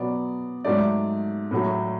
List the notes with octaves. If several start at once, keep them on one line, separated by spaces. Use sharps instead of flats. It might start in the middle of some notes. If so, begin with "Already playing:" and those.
Already playing: B2 F#3 B3 D5
G#2 F#3 A3 D5
A2 F#3 A3